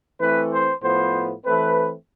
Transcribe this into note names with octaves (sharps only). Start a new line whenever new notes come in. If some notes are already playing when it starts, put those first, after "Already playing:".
E3 A3 C4 B4
C5
A2 F3 B3 C5
E3 A3 C4 B4